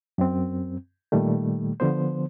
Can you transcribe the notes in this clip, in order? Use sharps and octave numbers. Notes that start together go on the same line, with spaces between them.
F#2 C4
A#2 D#3 G3 A3
D3 F3 B3 C5